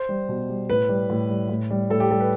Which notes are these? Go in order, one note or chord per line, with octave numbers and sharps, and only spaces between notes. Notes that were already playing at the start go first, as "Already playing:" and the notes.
Already playing: C5
G3
B2
G3
A2 B4
G3
A2
G3
A2
G3
A2 A4
G4
G3 A4
B4